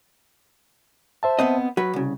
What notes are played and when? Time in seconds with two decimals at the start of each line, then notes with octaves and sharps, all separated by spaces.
1.23 C5 E5 A5
1.39 B3 C4 D#5
1.77 F#3 F#4 B4
1.93 C2 C#3